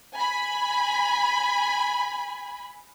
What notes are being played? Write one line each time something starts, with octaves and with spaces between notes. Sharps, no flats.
G#5 B5